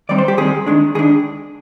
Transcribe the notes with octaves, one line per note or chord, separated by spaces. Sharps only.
D#3 G3 C4 D5
C5
G4
D#3 G3 C4 G#4
D#3 G#3 D4
D#3 G#3 D4 G#4